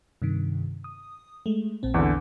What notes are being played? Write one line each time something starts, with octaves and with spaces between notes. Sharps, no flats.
G2 C3 D#3
D#6
G#3 A3
A#1 A#2 C4
E2 D3